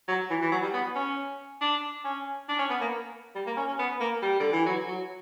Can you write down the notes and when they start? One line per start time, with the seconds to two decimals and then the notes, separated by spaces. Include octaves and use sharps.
0.08 F#3
0.30 E3
0.42 E3
0.52 F#3
0.62 G3
0.74 B3
0.96 C#4
1.61 D4
2.04 C#4
2.49 D4
2.59 C#4
2.70 B3
2.81 A#3
3.35 G3
3.47 A#3
3.57 C#4
3.68 C#4
3.79 B3
4.00 A#3
4.22 G3
4.40 D3
4.52 E3
4.66 F#3
4.88 F#3